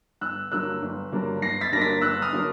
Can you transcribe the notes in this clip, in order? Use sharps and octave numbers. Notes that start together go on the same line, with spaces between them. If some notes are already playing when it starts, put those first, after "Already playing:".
G1 E6 F#6
G2 D3 F#3 A#3 E6 F#6
G1
G2 D3 F#3 A#3
G1 A#6 C7
A6 B6
G2 D3 F#3 A#3 A#6
A6 B6
G1 E6 F#6
D#6 F6
D3 F#3 A#3